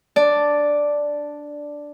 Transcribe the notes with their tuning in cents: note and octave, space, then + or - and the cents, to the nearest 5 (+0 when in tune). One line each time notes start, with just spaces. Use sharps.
D4 +0 D5 +0